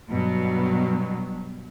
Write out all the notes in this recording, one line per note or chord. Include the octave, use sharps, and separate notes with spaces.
G2 B2 F#3